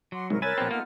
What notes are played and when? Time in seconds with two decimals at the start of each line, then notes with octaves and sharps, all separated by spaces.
0.12 F#3 F#5 C6 D6
0.30 C2 G#2 A#4 C#6
0.42 A#4 C#5 G#5 B5 E6 F#6 A6
0.58 A#1 B3 C4 F4 A4
0.71 A#3 D#4 F#5 F6